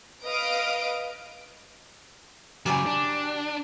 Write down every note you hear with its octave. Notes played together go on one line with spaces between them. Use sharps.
B4 D#5 F5 D#6 F6 D7
C#3 F#3 G4 D5 G#5
D4